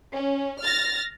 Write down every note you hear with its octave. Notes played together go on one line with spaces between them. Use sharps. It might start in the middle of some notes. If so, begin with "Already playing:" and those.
C#4
F6 A6 A#6